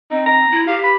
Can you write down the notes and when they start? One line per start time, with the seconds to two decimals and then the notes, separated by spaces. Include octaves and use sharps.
0.11 C4 D#4
0.26 A#5
0.51 E4
0.67 G4 F5
0.84 B5